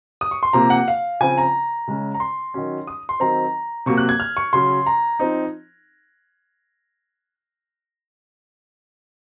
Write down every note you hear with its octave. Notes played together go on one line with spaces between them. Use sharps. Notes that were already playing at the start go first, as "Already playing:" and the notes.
D#6
C#6
C6
C3 F3 A#3 A#5
F#5
F5
C#3 F3 C4 G#5
A#5
C#3 G#3 C#4
A#5
C6
D#3 F#3 C#4
D#6
C6
D#3 F#3 C4 A#5
C3 F#3 A#3 C#6
F#6
G#6
F6
C#6
C#3 F#3 C#4 C6
A#5
F3 C4 D#4